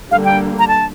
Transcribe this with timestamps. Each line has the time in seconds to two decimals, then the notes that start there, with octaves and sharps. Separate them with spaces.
0.11 D3 G3 A#3 F5
0.25 G5
0.59 A#5
0.68 A5